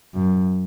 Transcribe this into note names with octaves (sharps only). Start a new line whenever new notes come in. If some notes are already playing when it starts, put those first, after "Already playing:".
F#2